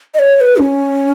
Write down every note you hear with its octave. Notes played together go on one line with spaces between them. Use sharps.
D#5
C#5
C#5
B4
C#4